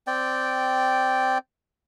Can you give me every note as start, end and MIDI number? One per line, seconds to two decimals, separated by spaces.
0.07 1.38 60
0.07 1.38 74
0.07 1.38 79